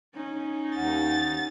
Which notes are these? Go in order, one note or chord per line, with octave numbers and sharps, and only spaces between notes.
C#4 D#4
D#2 F#5 A6